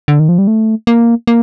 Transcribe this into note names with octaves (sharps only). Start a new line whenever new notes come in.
D3
D#3
F3
G3
A3
A#3
A#3